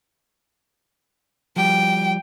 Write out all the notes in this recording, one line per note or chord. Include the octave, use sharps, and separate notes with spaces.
F3 G3 G5